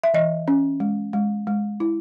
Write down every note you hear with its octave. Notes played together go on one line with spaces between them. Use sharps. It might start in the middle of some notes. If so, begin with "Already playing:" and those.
E5
E3 D#5
C#4
G#3
G#3
G#3
E4